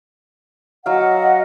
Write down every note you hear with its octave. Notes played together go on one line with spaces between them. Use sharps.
F#3 D#5 F5 F#5